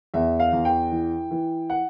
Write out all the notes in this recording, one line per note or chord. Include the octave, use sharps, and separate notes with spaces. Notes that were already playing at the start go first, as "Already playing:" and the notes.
E2 E5
F5
E2
G5
E3
E3
F#5